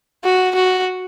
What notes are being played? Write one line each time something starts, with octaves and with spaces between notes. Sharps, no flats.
F#4
F#4